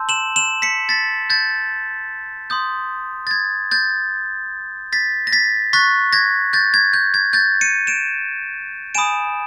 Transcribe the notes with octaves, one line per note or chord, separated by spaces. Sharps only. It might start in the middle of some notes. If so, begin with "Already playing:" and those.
Already playing: A5 C6 E6 G6
E7 F#7
E7 F#7
B6 C#7
A6 B6
G6 A6
C6 D#6 G6
A6
G#6
G6 A6
A6 B6
A#6
A6 B6
C#6 F#6 A6 B6
G#6 A#6
G6 A6
G#6
G6
G#6
G6 A6
C#7 D#7
D7 E7
G#5 B5 D#6 D7 E7